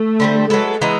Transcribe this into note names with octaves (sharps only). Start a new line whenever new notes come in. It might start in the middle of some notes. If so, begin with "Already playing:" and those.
Already playing: A3
D3 G3 C4
F#3 G#3 B3 E4 A4
E3 G#3 B3 D#4